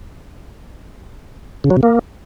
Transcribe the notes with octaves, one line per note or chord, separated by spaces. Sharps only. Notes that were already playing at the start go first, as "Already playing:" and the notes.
C#3
F#3
C3
A#3